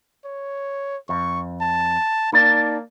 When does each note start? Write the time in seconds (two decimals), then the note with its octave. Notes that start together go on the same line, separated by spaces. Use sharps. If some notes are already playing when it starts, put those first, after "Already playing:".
0.25 C#5
1.09 F2 C#6
1.61 A5
2.33 A#3 D#4 D5 A5